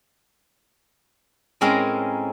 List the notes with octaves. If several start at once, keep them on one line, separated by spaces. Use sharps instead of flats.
A2 G#3 C4 C#4 A#4 A#5